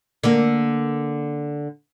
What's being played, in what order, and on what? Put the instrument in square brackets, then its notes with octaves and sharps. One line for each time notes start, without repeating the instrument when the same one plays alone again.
[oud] D3 A#3